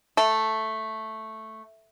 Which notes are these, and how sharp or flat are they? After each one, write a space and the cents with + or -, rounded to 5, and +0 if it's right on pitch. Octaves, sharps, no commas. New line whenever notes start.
A3 +0 A4 +0